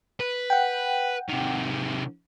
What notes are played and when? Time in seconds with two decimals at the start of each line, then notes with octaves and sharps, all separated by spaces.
0.20 B4
0.50 F#5 G5
1.29 C3 D#3